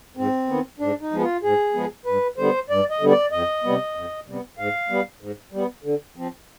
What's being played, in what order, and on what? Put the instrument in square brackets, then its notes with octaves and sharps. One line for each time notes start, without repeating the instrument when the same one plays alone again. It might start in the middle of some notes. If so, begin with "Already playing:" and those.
[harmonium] G#2 C4
D#3 B3
G#2 D4
D#4
F3 G#3 B3
F4
G#2 G#4
F3 G#3 B3
G2 B4
D3 G3 B3 C5
G2 D5
D#5
D3 G3 B3
D5
F2 D#5
C3 G3 B3
F2
C3 G3 B3
G#2 F5
G3 B3
G#2
G3 B3
D3
F3 C4